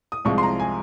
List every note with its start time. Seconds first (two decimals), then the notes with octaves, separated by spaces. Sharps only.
0.12 D#6
0.25 C2 C3 F3 G#3 C#6
0.38 C6
0.43 A#5
0.60 G#5